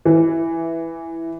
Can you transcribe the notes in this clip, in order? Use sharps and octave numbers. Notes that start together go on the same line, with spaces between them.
E3